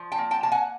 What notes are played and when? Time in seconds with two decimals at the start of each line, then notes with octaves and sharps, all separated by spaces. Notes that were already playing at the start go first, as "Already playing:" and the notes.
Already playing: F3
0.12 G5 A5
0.18 A#3
0.31 G5 A5
0.43 A#3 A5
0.52 F#5 G#5